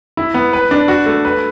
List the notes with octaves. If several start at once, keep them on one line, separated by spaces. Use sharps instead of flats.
E4
B3
B4
D4
F#4
A3
B4